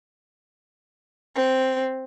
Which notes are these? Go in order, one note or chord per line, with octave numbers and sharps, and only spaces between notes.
C4